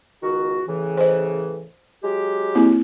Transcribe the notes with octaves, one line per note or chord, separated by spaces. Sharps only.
C#2 D#3 F#4
A2 C#3 E3
C5 D#5
F#3 G#3 G4
A#3 C4 E4